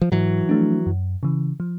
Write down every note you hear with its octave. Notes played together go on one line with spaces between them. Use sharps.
F3
G#2 E3 F#3
F3 A3 D4
F#2
C#3 E3
F3